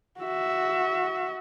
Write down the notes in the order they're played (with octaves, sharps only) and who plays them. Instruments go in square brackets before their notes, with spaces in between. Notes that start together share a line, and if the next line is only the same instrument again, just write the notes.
[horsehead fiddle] F#4 E5